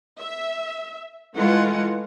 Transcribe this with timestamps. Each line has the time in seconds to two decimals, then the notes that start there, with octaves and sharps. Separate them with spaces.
0.20 E5
1.36 E3 G#3 A3 F4 F#5